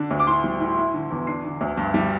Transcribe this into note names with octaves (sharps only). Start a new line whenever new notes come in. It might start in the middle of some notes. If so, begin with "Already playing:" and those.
Already playing: D3 D4
D2
D6
A2 C6
G3
A2
E4
D3
E2
D4 C7
D3
D2
G2
G3